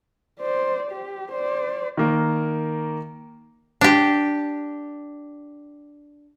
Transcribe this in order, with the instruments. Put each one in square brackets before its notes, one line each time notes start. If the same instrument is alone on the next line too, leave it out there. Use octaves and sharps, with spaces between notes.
[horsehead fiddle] C5 D5
G4
C5 D5
[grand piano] D#3 A#3
[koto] D4 G4